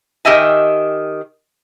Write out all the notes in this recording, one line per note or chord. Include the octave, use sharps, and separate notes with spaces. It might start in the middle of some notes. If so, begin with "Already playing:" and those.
D#3 G4 D#5 E5 G#5